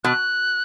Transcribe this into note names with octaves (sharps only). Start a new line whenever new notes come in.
B2 F#6